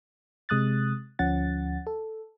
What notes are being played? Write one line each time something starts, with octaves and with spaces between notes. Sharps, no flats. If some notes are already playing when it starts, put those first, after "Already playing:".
C3 G#3 D#6 F#6 A6
D2 F3 C#4 F#5 A6
A4